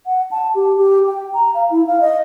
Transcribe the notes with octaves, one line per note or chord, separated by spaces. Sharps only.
F#5
A5
G4
G4
G5
A#5
F5
E4
F5
D#5